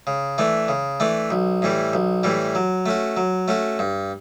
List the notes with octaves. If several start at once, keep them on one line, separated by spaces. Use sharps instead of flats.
C#3
E3 A3 D4
C#3
E3 A3 D4
B1
A2 E3 G3
B1
A2 E3 G3
F#3
A3 C#4 F#4
F#3
A3 C#4 F#4
G2